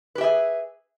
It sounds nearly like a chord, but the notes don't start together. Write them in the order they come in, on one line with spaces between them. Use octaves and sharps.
B4 G4 E5 G#4